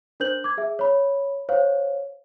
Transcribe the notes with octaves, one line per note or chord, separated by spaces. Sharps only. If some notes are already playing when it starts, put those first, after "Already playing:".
D4 A#4 C5 G6 F#7
D6 G#6
G#4 E5
C#5 B5
C5 C#5 F5